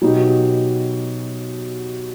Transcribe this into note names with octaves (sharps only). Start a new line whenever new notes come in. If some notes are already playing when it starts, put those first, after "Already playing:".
B2 F#3 B3 D#4 G4